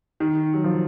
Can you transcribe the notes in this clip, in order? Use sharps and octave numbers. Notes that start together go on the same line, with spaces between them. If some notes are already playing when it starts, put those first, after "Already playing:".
D#3
F#3
F3